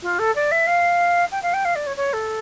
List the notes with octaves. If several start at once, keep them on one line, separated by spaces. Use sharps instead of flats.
F4
A4
D5
E5
F5
G5
F5
G5
F5
D5
C#5
C#5
A4